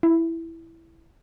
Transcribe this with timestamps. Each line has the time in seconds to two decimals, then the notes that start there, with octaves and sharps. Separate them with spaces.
0.03 E4